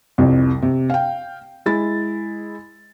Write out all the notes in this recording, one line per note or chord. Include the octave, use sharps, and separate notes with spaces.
C2 F2 C3
C3
F5 G5
G#3 E4 A6